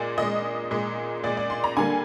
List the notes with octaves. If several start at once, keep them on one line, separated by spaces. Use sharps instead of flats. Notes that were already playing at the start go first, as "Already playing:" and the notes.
Already playing: A#2 G#3 D5
A#2 G#3 D#5
A#2 G#3
A#2 G#3 D5
D5
C6
A#5
D3 G3 A#3 G#5